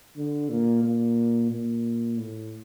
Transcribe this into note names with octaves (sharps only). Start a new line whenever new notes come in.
D3
A#2
A#2
A#2
A2